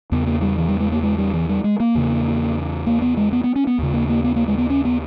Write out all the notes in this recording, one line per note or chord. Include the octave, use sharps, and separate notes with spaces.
E2 C#3 B3
A#3
G3
E3
G3
G#3
A#3
G#3
G3
E3
G3
G#3
A#3
E2 C#3
A#3
B3
G#3
B3
B3
C#4
B3
D#2 C#3
A#3
A#3
B3
A#3
G#3
B3
C#4
B3